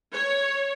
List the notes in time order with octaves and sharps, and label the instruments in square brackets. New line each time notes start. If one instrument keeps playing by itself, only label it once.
[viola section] C#5